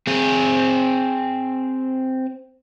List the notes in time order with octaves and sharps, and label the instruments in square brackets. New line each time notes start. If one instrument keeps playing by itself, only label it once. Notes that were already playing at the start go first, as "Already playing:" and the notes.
[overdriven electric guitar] C4 G#4